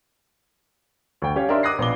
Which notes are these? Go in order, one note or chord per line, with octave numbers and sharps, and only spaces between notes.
D2 G5
C#4 G4 C#5 F5
D4 D#4 G4 A#4 E5 C6
D6 D#6 F#6 A#6 C7
A#1 B2 B4 F5 D6 G7